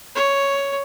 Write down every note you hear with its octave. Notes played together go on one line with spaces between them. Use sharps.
C#5